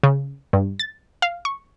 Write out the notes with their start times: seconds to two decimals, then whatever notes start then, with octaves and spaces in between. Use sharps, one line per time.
0.03 C#3
0.53 G2
0.79 A6
1.22 F5
1.45 C#6